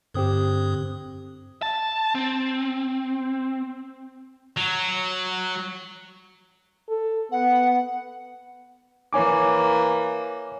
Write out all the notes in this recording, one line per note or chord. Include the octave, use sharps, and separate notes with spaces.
G2 D3 C4 G4 D#6
A5
C4
F#3
A4
B3 F#5
E3 A#3 C#5 G#5 D6